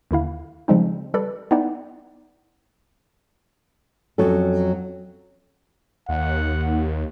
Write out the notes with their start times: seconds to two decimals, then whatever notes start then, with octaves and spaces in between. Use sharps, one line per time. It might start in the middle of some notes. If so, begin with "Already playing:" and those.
0.11 D#2 D3 E4 F5
0.68 C#3 F3 G3 G#3 C4 D#4
1.14 G3 A4 B4 D5
1.51 B3 D#4 E4 D5 F#5 G5
4.18 F2 F#3 C#4 A4
6.09 D#2 F#5